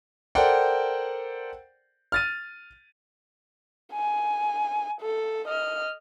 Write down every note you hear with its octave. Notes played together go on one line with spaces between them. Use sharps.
A4 A#4 C5 D5 F#5 G5
F6 A6 D#7
G#5
A4
D#5 F6